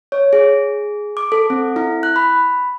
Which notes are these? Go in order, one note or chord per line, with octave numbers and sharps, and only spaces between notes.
C#5
G#4
D6
A4
C4
E4
F#6
B5